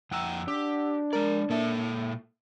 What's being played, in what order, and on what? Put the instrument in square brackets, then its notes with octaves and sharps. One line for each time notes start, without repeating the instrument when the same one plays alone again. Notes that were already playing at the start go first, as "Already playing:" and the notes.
[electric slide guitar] F2 G5 A#5 [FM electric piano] F#5 E6
[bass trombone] D4 [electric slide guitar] G4
[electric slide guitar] G#3 D5 [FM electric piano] A#4
[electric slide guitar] A#2 A4 A5 [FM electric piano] A#3 E5